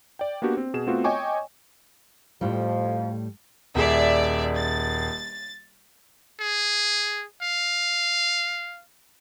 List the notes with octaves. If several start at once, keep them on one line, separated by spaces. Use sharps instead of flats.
D5 G5
A#3 B3 D4 F#4 G4
C4
B2 G#4 E7
A3 B3 C4 F4 F#4
C#5 D#5 G5 G#5 C#6 D6
F2 A2 F3 G3
D#1 G#4 D5 E5
A6
G#4
F5